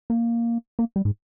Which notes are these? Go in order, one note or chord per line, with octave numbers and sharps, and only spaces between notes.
A#3
A#3
G3
G#2